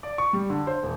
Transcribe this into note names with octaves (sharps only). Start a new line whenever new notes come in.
D5
C#6
G3
D3
C5
E1